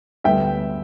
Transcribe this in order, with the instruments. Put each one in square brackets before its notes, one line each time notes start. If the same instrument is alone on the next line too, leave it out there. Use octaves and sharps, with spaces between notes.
[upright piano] D2 D3 G3 B3 E5 G5